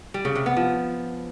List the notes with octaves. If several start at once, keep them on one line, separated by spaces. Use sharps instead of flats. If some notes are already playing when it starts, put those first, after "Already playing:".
G3
C#3
C3
B3
F3